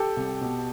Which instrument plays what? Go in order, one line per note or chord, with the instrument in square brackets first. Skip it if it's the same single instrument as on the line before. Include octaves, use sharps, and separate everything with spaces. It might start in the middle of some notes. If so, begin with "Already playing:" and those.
Already playing: [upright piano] G4 A4
C2
B2